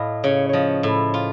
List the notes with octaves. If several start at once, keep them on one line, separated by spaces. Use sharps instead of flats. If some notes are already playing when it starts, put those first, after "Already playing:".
Already playing: A2 D#5 F5
C#3 C#5
F3 C#5 D#5
A2
F4